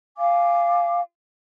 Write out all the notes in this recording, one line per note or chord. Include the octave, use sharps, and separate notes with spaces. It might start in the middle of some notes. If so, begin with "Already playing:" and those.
F5 G#5 D6